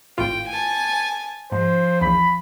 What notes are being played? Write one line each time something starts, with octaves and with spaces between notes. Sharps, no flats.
G#1 A2 F4 G5
G#5 A5
G#2 F3 C5
A#1 E2 B5